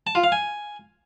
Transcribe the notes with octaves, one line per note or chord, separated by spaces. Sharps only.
A5
F4
F5
G#5